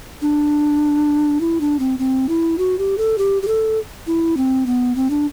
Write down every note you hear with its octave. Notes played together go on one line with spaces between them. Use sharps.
D4
E4
D4
C4
C4
E4
F#4
G4
A4
G4
G4
A4
E4
C4
B3
C4
D4